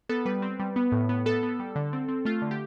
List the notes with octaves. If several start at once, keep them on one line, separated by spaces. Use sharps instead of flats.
B3 A4
G3 B4
C4
G3
B3
A2
B3
B3 A4
B3
G3
D3
C4
C4
A3 F4
D3
G4